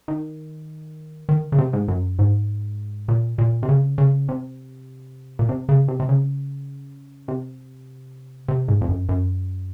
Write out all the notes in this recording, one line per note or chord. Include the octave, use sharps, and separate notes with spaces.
D#3
D#3
C#3
C3
G#2
F#2
G#2
A#2
A#2
C3
C#3
C#3
C3
A#2
C3
C#3
C3
C3
C#3
C3
C3
G#2
F2
F#2
F#2